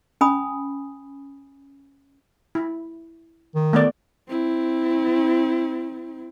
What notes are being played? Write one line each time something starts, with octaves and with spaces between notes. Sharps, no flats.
C#4 G#5 B5 D#6
E4
D#3
A3 B3 D5
C4 E4